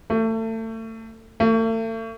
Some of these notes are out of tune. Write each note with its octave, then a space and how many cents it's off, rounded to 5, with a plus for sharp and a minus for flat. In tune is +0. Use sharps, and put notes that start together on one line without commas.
A3 +30
A3 +40